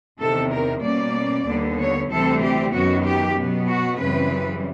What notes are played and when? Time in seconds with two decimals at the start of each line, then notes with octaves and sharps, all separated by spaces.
0.19 E2 C3 D#3 A4
0.51 A#4
0.83 B2 G3 A#3 C#4 D5
1.46 D#2 D3 G3 B3
1.77 C#5
2.09 D2 C3 E3 G3 C4 A4
2.41 G4
2.72 F#2 D#3 F#3 B3 F#4
3.05 G4
3.36 B2 F#3 B3
3.68 F#4
3.99 F#2 C#3 E3 G3 C4 B4